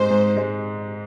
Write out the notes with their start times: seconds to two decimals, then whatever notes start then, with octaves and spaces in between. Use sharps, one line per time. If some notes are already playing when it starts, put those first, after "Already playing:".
Already playing: G#2 G#3 C5
0.10 G#2
0.37 G#3